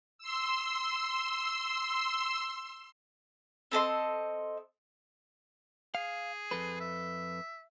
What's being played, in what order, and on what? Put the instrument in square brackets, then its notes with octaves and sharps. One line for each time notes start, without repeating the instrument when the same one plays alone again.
[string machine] C6 E6
[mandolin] C4 A4 D#5 C6
[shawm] G#4 [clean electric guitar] F5
[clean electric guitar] F2 A4 B4
[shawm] E5